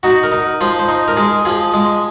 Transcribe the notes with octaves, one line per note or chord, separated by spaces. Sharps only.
D#4 F#4
A#4
D#4
F3 C5
C5
D#4
A#4
G#3 G#4
F3 G#4
G#3